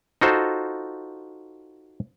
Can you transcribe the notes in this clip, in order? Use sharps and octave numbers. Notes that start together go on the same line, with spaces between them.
D#4 F4 F#4 A4 C5